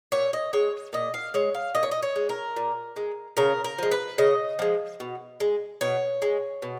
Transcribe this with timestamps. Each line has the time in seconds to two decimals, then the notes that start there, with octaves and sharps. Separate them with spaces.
0.12 A#2 C#5
0.33 D#5
0.53 G#3 C#5
0.93 A#2 D#5
1.14 F5
1.34 G#3 C#5
1.55 F5
1.75 A#2 D#5
1.83 C#5
1.91 D#5
2.03 C#5
2.16 G#3
2.29 A#4
2.57 A#2
2.96 G#3
3.37 C#3 A#4
3.64 A#4
3.78 F3 G#3
3.91 B4
4.18 C#3 D#5
4.59 F3 G#3
5.00 B2
5.40 G#3
5.81 B2 C#5
6.22 G#3
6.62 B2